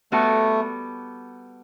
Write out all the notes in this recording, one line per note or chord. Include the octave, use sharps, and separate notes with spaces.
G3 A3 B3 F#4 A4